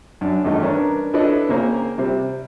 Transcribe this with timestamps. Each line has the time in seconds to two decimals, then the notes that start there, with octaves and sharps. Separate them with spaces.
0.21 F#2 D4
0.44 E2 G2 D#3 A3 D#4
0.62 C#4 D4 A#4 B4
1.14 D4 E4 A4 B4 C#5 D#5
1.49 C#3 A#3 C4 A#4
1.98 C3 G3 C4